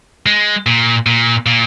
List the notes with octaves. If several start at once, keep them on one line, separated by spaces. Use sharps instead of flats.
G#3
A#2
A#2
A#2